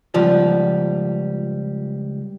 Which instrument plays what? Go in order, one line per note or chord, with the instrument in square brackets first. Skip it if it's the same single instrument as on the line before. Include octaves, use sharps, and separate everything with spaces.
[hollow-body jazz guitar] C#2 F3 G3